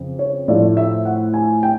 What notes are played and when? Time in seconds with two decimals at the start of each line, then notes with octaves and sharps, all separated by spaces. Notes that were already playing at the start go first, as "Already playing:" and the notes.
Already playing: F2 C#3
0.19 C#5
0.48 A2 F3 A3 D5
0.77 E5
1.05 F#5
1.34 G#5
1.63 G5